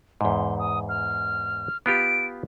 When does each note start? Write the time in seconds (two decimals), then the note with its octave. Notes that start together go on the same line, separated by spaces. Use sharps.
0.21 E2 G#2 C6
0.59 D#6
0.89 F6
1.86 B3 F4 G4 D7